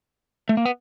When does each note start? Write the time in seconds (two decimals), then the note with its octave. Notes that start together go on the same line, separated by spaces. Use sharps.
0.49 A3
0.57 A#3
0.65 B3